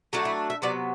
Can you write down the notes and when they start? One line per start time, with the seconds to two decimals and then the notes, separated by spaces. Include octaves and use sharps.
0.13 F#3 A3 D4 F#4
0.25 E4
0.50 E5
0.62 C3 F#3 B3 D5